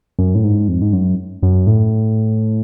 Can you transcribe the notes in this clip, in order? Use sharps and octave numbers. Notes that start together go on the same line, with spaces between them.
F#2
A2
G#2
F2
G#2
F#2
F#2
A2